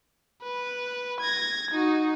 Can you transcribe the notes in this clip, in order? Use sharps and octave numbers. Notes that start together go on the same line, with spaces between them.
B4
G#6 A#6
D#4 F#4